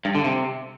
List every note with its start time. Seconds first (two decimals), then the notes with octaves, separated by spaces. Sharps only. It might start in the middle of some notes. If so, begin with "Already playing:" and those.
0.05 G2
0.15 D3
0.24 C3